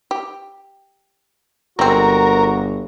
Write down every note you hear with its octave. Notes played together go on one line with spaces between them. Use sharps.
G4
G1 G#3 C4 F#4 A#4